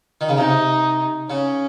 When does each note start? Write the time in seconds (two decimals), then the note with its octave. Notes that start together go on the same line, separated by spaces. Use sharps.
0.21 D#3
0.29 C#3
0.37 C3 D#4
1.30 C#3 C#4